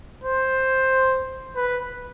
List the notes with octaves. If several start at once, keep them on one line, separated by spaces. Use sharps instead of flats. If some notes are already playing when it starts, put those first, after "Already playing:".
C5
B4